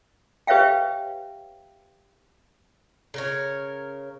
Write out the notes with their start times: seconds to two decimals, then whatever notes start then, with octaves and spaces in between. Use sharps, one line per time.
0.47 G4 B4 C#5 E5 F5 G5
3.14 C#3 A#4 C#5